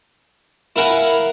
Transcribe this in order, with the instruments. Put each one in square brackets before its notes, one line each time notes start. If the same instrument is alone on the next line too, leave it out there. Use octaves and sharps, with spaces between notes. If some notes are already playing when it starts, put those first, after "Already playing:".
[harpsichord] E4 A#4 F5 F#5 G#5